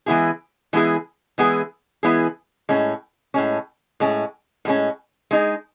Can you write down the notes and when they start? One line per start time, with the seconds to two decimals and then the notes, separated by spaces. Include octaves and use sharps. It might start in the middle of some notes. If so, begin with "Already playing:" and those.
0.06 E3 G#3 B3 E4 G#4
0.73 E3 G#3 B3 E4 G#4
1.38 E3 G#3 B3 E4 G#4
2.03 E3 G#3 B3 E4 G#4
2.69 A2 G#3 C#4
3.34 A2 G#3 C#4
4.00 A2 G#3 C#4
4.65 A2 G#3 C#4
5.31 G#3 D#4 G#4